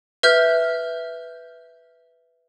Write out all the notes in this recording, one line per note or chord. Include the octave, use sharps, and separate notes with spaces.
B4 E5 F6 G6